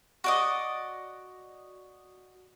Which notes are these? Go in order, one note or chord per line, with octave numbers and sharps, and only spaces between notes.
F#4 D5 D#5